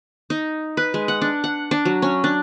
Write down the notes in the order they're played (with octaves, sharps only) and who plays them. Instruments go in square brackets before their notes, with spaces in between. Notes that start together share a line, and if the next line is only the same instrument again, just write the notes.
[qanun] D#4
B4
G#3
F#5
D4
F#5
D4
F#3
C#4
D4